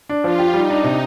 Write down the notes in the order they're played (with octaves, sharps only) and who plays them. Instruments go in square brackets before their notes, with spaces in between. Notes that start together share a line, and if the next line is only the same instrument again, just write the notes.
[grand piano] D4
[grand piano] F3 [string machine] F4
[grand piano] G4
[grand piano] G3 [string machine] D#4
[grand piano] D4
C3